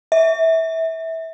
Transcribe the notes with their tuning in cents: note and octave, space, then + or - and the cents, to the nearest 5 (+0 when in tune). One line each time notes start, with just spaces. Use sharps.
E5 -20